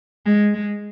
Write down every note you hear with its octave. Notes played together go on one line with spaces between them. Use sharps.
G#3
G#3